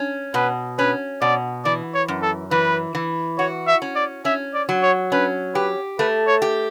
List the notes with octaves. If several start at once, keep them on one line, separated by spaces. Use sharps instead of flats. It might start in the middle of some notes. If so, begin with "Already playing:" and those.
Already playing: C#4
B2 B4
C#4 B4
B2 D5
E3 D5
C#5
F#2
A4
E3 B4
E3
F#4 C#5
E5
C#4
D5
C#4 E5
D5
F#3
C#5
C#4 B4
G4 B4
A3 B4
C#5
G4